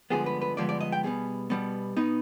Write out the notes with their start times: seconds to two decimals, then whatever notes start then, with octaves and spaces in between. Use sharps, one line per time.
0.10 G2 D3 F3 G#3 B3 G#4
0.26 B4
0.41 B4
0.57 G2 D3 F3 G#3 B3 D5
0.69 D5
0.81 D#5
0.92 G5
1.03 B2 G3 B3 G#4
1.50 B2 G3 B3
1.97 B2 B3 D#4